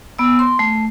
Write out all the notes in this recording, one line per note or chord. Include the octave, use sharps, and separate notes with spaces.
B3 E6
C6
A3